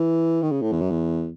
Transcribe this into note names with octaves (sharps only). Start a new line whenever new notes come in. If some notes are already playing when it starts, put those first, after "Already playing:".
Already playing: E3
D#3
C#3
A2
E2
F#2
E2